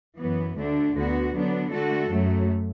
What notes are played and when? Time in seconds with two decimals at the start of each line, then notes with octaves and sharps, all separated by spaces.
0.19 F#2 E3 B3
0.57 D2 D3 A3 D4
0.95 D2 D3 B3 F#4
1.34 D3 F#3 B3 D4
1.72 D3 A3 F#4 A4
2.10 F#2 F#3 A3